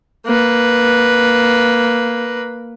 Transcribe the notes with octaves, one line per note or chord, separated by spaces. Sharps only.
A#3 B4